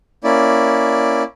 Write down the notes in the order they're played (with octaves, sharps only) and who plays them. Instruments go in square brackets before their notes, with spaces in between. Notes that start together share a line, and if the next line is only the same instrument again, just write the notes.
[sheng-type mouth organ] A#3 C#4 E4 D5